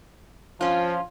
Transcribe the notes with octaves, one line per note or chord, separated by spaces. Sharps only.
F3 C#4 F4